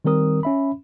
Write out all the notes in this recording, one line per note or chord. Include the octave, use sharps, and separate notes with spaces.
D#3 G3 C4 A#4 D#6
C#4 E5 B5